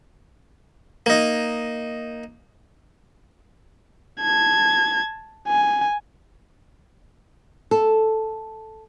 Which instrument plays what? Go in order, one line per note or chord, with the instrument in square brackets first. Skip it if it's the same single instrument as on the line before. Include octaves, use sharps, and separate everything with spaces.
[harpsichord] A#3 D#4
[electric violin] A5 G#6
G#5
[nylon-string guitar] A4